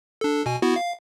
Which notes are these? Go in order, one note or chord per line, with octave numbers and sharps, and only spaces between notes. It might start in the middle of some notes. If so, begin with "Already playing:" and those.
D4 A4
B2 G#5
B3 E4 F#4
F5